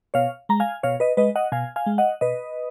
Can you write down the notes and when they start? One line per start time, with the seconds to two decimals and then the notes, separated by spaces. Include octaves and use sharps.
0.14 B2 C#5 F5
0.49 G#3 A#5
0.60 F5 G#5
0.83 B2 C#5 F5
1.00 B4 D#5
1.17 G#3 B4 D#5
1.36 D#5 F#5
1.52 B2 F5 G#5
1.76 F5 G#5
1.86 G#3
1.98 D#5 F#5
2.21 B2 B4 D#5